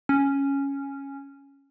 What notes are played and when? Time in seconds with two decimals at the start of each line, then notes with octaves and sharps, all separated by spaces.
0.09 C#4